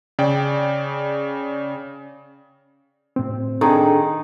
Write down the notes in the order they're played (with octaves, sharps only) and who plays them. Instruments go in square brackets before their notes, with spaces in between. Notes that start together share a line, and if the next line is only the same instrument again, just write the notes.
[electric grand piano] C#3 D5 G5
[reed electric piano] A2 C4
[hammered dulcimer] D#3 [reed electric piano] D4 G#4 A4